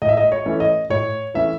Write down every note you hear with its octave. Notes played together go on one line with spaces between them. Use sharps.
A2 D#5
E5
D#5
C#5
E3 A3 C#4
D#5
A2 C#5
E3 A3 C#4 E5